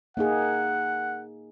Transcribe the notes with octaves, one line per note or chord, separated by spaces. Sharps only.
A#3 D#4 G#4 F#5